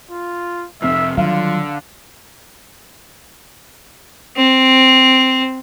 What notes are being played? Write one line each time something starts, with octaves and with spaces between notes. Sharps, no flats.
F4
F1 F2 C3 E5 F6 C7
D3 D#3 F#3 G3 F4 F5
C4